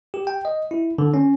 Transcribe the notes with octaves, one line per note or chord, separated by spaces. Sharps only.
G4
G5
D#5
E4
D3
C#4